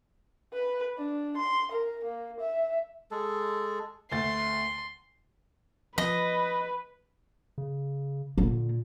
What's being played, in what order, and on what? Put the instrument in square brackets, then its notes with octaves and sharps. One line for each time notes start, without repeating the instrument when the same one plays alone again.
[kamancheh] B4
D4
C6
A#4
A#3
E5
[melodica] G#3 A4
[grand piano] D2 A3 A6 [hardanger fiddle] C6
[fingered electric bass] F3 [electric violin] B4 [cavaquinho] D#5
[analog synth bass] C#3
[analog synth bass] A#2 [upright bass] D3 A#3